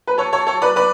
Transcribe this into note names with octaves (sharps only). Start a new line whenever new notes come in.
B4
A4 C#5
A4 C#5
A4 C#5
B4 D5
B4 D5